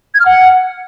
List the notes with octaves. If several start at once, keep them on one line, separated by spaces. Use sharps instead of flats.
G#6
F6
F#5